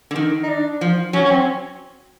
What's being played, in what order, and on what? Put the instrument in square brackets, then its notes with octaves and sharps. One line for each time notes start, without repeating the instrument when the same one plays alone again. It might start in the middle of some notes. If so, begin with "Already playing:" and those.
[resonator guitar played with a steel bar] D3
D#3
[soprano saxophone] D#4
D4
[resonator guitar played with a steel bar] F3
[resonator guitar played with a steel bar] F#3 [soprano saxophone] C#4
[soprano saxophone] C#4
C4